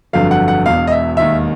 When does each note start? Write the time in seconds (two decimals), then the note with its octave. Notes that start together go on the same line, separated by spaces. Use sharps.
0.13 G1 F2 D3 F#3 F5
0.31 F#5
0.48 F#5
0.65 E1 E2 B2 F5
0.87 D#5
0.91 E5
1.17 E1 D#2 D#3 E5